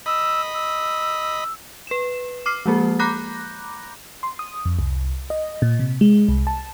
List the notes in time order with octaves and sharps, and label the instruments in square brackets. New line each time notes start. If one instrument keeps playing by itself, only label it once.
[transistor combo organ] D#5 B5 [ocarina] E6
[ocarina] E6
[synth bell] B4 E7
D6 F6 C7
F3 G#3 A#3 G#4
A#5 B5 D6 F#6 G6 A#6
[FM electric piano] C6
D#6
F2
C2
D#5
A#2
C3
G#3
C2
A5